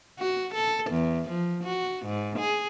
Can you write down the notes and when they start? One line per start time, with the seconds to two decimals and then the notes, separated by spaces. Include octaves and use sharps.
0.19 F#4
0.54 A4
0.90 E2
1.30 F3
1.64 F#4
2.06 G#2
2.39 G#4